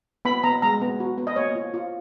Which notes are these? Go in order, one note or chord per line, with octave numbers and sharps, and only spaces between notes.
B3 B5
B3 A#5
G#3 A#5
B3
F#4
B3
D#5
A#3 C#5
F4
F4